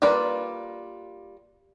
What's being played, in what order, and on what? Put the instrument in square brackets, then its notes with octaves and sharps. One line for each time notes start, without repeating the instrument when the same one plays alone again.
[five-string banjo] G3 A#3 F4 B4 D5